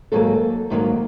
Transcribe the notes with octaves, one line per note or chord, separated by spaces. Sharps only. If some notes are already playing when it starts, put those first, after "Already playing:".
G#2 D#3 F#3 A#3 A4
G#2 D#3 F#3 A#3